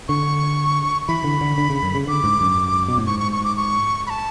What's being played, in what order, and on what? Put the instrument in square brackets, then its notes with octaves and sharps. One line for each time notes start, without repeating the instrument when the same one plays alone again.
[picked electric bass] D3 [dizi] C#6
[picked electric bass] E3 [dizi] B5
[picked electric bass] D3
D3
D3
C#3
F#2
C#3
[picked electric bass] D3 [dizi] D6
[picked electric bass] G#2
F#2
B2
A2
[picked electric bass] G#2 [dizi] C#6
[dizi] C#6
C#6
D6
C#6
B5
A5